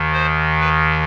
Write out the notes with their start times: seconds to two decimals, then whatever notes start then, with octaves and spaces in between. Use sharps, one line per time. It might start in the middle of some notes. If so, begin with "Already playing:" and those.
Already playing: D#2 D#3
0.12 C5
0.59 B4